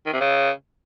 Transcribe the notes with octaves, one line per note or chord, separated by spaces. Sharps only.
D#3
C3
C#3